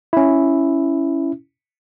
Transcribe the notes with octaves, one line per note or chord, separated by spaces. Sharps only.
C#4 E4